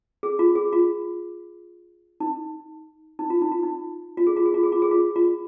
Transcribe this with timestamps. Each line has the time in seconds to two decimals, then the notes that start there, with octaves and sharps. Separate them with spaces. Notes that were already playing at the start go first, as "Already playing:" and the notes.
0.23 G#4
0.39 F4
0.56 G#4
0.73 F4
2.20 D#4
3.19 D#4
3.30 F4
3.42 D#4
3.52 F4
3.63 D#4
4.17 F4
4.27 G#4
4.37 F4
4.46 G#4
4.54 F4
4.63 G#4
4.72 F4
4.82 G#4
4.91 F4
5.16 F4